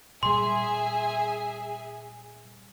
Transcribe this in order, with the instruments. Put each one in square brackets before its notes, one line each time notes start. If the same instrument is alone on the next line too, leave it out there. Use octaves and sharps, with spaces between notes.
[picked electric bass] A#2 G3 [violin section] G#4 E5 G#5 [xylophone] C6